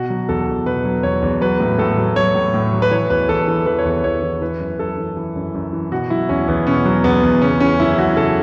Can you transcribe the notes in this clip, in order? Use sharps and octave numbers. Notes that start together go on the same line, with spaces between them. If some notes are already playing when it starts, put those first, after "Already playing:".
Already playing: B2 F#4
F#3
E2 A4
E2
B2 B4
F#3
E2 C#5
E2
F#3 B4
A2
A2 A4
F#3
F#3 C#5
A2
A2
F#3
B4
E3 C#5
E2 B4
E2 A4
E3 A4
E3 B4
C#5
E2 B4
E2 C#5
E3
E3 B4
F#2
F#2 A4
E3
E3
F#2
F#2
E3
B2 F#4
F#3 E4
E2 C#4
E2 B3
B2 C#4
F#3
E2 B3
E2
C#3 C#4
E3 C#4
F#2 E4
F#2 F#4
C#3 A4